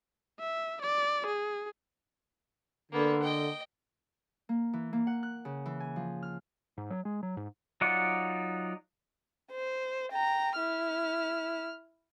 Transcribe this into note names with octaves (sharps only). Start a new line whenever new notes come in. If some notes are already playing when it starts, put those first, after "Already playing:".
E5
D5
G#4
D3 A#3 B3
D#5 G5
A#3
E3
A#3
F#5
F#6
C#3
E3
G#5
F3
F6
G#2
F#3
G#3
F#3
G#2
F#3 D#4 F4 D5 F#5
C5
G5 A#5
E4 F6